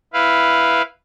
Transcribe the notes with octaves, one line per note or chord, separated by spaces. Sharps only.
E4 B4 F5